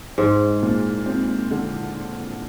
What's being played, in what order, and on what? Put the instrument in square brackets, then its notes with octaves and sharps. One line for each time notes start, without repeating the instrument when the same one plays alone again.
[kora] G#2 [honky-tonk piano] G#3
[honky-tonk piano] A#2
C4
D3